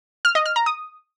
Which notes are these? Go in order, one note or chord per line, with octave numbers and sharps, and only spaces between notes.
F6
D#5
F6
A#5
D#6